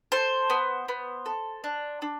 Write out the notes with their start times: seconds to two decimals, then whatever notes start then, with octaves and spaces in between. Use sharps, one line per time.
0.12 A4 C5
0.50 B3
0.88 B3
1.26 A4
1.64 D4
2.02 D4